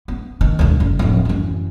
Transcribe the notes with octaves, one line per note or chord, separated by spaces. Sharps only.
B3
D#3
E1 D2
F#1
D1 F2
F#2 E3